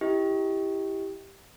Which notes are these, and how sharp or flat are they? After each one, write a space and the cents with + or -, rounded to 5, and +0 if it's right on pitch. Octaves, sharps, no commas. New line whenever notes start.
E4 +0 G4 +0 D#5 +30